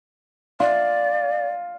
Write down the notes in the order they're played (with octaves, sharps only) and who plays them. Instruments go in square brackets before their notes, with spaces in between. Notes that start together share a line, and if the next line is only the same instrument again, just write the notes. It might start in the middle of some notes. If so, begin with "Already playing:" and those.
[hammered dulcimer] F4 [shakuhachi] D5